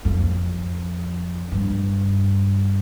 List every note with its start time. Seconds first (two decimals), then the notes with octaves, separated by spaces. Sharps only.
0.05 F2
1.52 G2